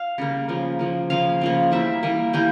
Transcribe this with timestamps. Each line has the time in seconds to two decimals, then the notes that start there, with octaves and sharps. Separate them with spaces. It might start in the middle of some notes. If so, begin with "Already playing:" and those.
Already playing: F5
0.18 C#3 G3 A#3
0.49 C#3 F3 A#3
0.79 C#3 F3 A#3
1.10 C#3 F3 A#3 F5
1.41 C#3 F3 A#3
1.71 E3 G3 A#3 E5
2.03 E3 G3 A#3
2.33 E3 G3 A#3 G5